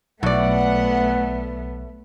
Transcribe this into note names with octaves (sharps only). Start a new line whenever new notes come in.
B1 A2 A3 B3 D5 F#5